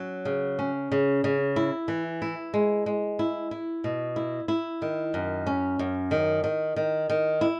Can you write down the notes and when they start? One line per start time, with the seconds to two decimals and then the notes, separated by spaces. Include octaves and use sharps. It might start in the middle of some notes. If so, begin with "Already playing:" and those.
Already playing: F#3 C#4
0.25 C#3
0.59 C#4
0.92 C#3
1.24 C#3
1.56 E4
1.88 E3
2.22 E4
2.54 G#3
2.86 G#3
3.19 E4
3.51 E4
3.84 B2
4.16 E4
4.48 E4
4.82 D#3
5.14 F#2
5.47 C#4
5.79 F#2
6.11 D#3
6.44 D#3
6.76 D#3
7.10 D#3
7.41 E4